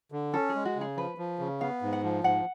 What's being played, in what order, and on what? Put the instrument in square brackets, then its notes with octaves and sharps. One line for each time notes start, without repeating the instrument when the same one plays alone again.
[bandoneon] D3
[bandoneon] C#4 [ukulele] A4
[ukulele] G#4
[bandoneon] G#3
[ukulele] F#4
[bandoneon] C#3
[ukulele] G#4
[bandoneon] F3 [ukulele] B4
[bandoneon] F3
C#3
[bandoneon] B3 [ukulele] F5
[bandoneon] G#2
[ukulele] F#5
[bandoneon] F3
[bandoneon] G#2 [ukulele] F#5